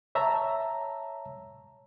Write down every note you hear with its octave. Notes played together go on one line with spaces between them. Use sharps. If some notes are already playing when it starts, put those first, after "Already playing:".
C#5 E5 A5 A#5